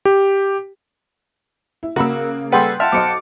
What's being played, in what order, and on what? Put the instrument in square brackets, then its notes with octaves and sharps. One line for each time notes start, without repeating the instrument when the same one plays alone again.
[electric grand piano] G4
[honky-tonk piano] E4
[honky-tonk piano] C#3 A#3 [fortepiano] F#4 B5 E6 [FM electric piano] A#4
[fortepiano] G3 G#4 B4 [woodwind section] A4 [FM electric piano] F#5 G5 C6
[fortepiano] F4 E5 [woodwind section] F#5 G5 A5 [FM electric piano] F6
[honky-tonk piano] B1 D#5 [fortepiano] C5 C6 [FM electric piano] D6 C#7